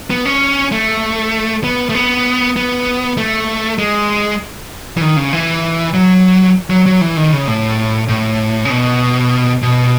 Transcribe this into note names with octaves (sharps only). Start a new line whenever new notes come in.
B3
C#4
A3
B3
A3
B3
B3
A3
G#3
E3
D#3
C#3
E3
F#3
F#3
F#3
E3
D#3
C#3
A2
A2
C#3
B2
B2